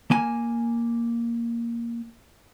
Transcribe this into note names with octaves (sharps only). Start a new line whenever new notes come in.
A#3 G#5